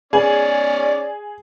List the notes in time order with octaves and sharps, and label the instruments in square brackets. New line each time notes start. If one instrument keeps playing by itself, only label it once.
[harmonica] C#4 D5 [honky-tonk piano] G#4